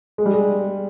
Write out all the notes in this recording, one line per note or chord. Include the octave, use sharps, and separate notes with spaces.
G#3
G3
G#3